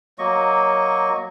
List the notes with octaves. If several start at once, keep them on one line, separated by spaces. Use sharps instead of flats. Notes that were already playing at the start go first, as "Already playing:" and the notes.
F#3 A#3 D#5 C#6